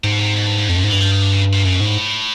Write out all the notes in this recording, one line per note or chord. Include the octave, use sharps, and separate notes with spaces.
G#2 C3
B2
C3
B2
G2
G2
F2 A2
F#2 A#2
G#2
G2 E3
F3
D#3
D3
C#3
A#2
F#2 C#3
G#2 B2
A2